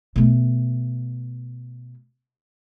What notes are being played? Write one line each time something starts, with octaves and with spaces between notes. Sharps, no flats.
B2 A3